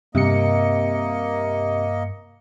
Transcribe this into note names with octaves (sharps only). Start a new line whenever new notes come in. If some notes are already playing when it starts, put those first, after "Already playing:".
G2 C3 A#3 D#5 C#7